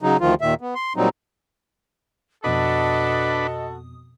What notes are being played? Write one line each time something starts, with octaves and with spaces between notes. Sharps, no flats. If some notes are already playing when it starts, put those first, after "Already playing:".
C#3 F#3 D#4
D2 D#3 F3 F4
D#2 A#2 D#3 E5
B3
C6
A#2 F#3 G3 C4 D#4
F2 B2 D4 F#4 A4 B4 D#5 D#6